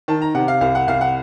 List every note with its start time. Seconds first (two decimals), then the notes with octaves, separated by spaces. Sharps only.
0.08 D#3 A5
0.22 A#5
0.35 C3 F#5
0.48 F5
0.61 C2 F5
0.75 F#5
0.87 C2 F5
1.01 F#5